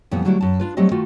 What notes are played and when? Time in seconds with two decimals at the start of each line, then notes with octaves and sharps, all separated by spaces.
0.11 F2 A#2 E3 G3 B3
0.25 D3 F#3 G3 A3 D4 E4
0.41 F#2 A5
0.60 D4 F4 B4
0.77 F#3 G3 A3 C4 G4 D#5
0.91 D#3 A3 F4 F#4